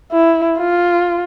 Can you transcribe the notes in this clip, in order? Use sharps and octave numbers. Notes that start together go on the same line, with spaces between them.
E4
F4